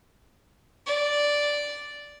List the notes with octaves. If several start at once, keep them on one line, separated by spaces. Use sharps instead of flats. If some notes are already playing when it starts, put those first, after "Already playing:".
D5